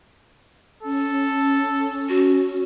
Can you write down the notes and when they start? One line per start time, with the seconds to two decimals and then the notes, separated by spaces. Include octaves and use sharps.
0.83 C#4 A4
2.09 F#4